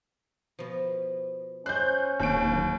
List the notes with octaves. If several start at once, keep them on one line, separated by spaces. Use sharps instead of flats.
B2 F3
C#4 C5 F#6 G6
D1 D#2 D7